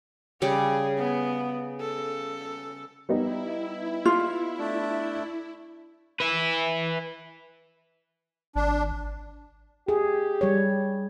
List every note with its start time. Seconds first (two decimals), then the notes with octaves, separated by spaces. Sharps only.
0.42 C#3 G3 G#4 C#6
0.98 B3
1.81 A4
3.09 G3 B3 D#4 E4
4.05 F4
4.58 A3 D4
6.20 B4 E5
8.56 G#1 D4
9.89 G4 G#4
10.41 G3 C#5